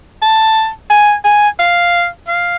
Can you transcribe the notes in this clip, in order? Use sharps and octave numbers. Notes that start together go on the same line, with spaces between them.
A5
G#5
G#5
F5
F5